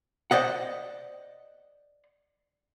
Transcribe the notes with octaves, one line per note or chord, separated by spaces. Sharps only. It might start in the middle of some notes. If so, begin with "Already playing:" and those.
C5 D5 D#5 F#5